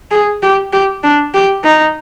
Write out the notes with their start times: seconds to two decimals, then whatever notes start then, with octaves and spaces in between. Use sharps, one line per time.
0.11 G#4
0.43 G4
0.73 G4
1.04 D4
1.34 G4
1.64 D#4